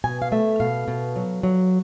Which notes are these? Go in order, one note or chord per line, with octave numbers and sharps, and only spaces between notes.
B2 G#5
F5
A3 E5
B2 F5
B2
F#3
F#3